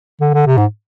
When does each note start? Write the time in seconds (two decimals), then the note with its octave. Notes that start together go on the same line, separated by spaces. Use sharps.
0.21 D3
0.34 D3
0.46 C3
0.57 G#2